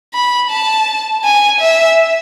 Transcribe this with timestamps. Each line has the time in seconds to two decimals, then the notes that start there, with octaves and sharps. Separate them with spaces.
0.14 B5
0.50 A5
1.24 G#5
1.60 E5